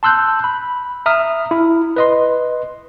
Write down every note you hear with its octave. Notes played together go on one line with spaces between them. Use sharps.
A5 C6 E6 F#6 G6
B5
E5 A#5 D#6 F6
E4
B4 D#5 C6